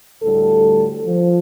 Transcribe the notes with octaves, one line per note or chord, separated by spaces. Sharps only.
D2 A2 G3 A4
F3